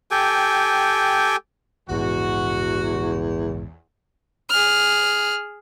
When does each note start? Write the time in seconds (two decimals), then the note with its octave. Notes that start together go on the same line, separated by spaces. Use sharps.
0.11 G4 A4 G5 G#5
1.90 A#1 E2 G#2 C#3 F#4
4.50 G#4 F6